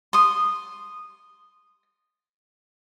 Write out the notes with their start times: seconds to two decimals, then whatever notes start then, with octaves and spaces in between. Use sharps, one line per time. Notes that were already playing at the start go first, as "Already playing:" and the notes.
0.13 C6 D#6